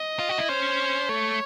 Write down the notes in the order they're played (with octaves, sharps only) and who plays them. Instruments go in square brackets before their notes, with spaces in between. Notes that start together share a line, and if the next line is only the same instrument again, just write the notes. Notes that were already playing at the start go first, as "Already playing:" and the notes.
Already playing: [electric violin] D#5
[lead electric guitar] F4
F#4
E4
[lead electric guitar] C#4 [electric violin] C5
[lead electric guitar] A3 [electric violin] C#5